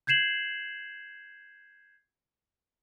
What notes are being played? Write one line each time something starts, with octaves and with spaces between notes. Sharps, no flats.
G6 G#6 C7 E7 F#7